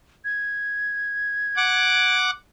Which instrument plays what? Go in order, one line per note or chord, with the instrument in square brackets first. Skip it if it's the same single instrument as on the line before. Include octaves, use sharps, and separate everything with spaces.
[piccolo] G#6
[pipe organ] F#5 D6